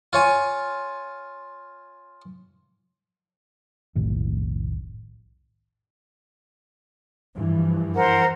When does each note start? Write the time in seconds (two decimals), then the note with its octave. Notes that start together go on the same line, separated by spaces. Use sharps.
0.13 F4 C#5 G#5
3.95 F1 B1 A2 D#3
7.36 G2 E3 F3
7.95 A#4 C5 F#5